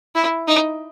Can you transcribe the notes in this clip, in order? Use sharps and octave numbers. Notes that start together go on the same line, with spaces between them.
E4
D#4